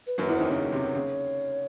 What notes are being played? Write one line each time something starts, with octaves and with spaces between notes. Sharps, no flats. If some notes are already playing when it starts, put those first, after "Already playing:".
B4
F#2 F#3 B4
E2 E3
D#2 D#3 C5
C#3 C#5
C3
C#3